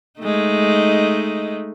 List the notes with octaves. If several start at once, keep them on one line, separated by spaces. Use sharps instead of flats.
G#3 A3 D#4